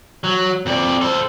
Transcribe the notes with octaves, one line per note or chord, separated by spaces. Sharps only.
F#3
F2 D5
A4 C5